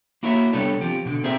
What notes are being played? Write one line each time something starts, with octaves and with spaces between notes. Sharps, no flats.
A#3 E4 F#4 A#4 C#5 E5
C3 G3 B3 D4 A4 C#5
F3 C4 G4
B2 D3
C4 G#4 A#4 C5 E5